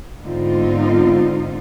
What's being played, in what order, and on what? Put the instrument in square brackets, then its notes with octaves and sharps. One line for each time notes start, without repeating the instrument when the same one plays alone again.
[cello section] G#2 D3 B3 C4 D#4 F4